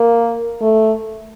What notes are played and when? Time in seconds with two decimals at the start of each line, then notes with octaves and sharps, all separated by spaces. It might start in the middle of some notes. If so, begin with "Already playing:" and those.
Already playing: A#3
0.61 A3